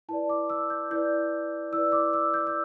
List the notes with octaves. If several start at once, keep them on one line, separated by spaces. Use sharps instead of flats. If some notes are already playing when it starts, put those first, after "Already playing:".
E4 B4 D5 A5
D6
E6
G6
E4 B4 D5 G6
E4 B4 D5 E6
D6
E6
G6
E6